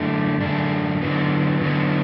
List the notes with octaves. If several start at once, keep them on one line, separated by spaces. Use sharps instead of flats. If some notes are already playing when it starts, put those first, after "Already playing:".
Already playing: F#2 D3 A3 D4
F#2 D3 A3 D4
D3 F#3 B3
D3 F#3 B3